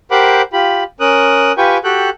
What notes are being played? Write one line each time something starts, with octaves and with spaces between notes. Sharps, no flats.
G4 A#4 C5 F#5 B5 D6
F4 G4 B5
C#4 A#4 D#6 F#6
F4 G4 B4 G5 G#5 C#6
F#4 G4 A4 G5 F#6